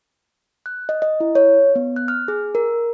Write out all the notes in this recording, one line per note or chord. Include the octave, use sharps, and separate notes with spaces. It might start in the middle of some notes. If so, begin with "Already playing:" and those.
F#6
D#5
D#5
E4
C#5
B3
F#6
F6
G#4
A#4